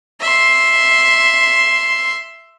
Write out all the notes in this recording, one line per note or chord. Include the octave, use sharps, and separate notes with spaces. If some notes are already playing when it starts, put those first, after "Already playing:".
E5 C6